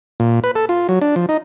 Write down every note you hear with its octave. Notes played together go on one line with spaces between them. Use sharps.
A#2
B4
A4
F4
F#3
D4
F3
D#4